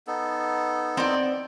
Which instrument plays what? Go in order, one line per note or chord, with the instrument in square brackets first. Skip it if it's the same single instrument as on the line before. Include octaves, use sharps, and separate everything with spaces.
[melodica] B3 D#4 A4
[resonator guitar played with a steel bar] C4 D5